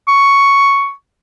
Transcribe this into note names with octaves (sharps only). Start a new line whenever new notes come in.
C#6